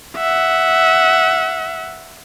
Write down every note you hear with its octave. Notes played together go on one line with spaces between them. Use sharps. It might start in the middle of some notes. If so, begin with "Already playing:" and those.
E5 F#5